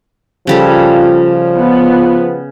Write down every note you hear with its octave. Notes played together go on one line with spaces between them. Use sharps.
C#3 F3 G3 F4 A4
B3 F4